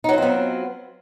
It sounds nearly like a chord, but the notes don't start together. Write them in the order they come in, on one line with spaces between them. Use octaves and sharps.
D#4 F#3 F4 C4 B3